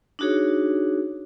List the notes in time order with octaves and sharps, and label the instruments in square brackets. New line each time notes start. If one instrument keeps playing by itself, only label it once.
[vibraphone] D4 D#4 F#4 G#4 C#5